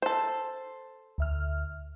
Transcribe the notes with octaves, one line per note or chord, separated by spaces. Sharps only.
A4 C5
D2 E5 F6